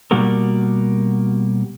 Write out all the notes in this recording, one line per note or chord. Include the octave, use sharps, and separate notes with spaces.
B2 G3 A#3 F#4 G4 A#4